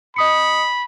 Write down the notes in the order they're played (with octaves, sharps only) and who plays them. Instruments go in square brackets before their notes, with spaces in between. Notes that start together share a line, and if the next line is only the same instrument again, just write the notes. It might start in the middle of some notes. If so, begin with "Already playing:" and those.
[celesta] D#5 D#6 C#7 [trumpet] B5